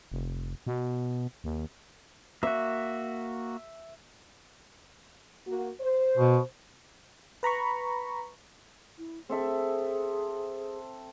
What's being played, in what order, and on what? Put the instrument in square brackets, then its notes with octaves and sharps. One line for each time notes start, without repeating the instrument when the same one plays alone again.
[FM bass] F1
B2
D#2
[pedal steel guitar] A#3 F#4 [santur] E5
[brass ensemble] A#3 F#4
C5
[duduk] B2
[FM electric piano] B4 A#5 B5 C#6
[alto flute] E4
[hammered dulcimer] C4 A4 E5 [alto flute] G#4